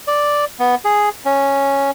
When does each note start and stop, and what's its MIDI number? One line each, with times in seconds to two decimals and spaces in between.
0.07 0.45 74
0.59 0.75 59
0.85 1.09 68
1.25 1.91 61